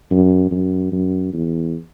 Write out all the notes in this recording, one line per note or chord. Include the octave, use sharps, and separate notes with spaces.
F#2
F#2
F#2
E2